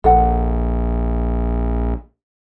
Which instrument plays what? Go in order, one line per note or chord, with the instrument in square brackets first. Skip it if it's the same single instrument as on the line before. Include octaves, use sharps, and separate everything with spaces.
[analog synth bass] A#1 [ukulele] A4 F#5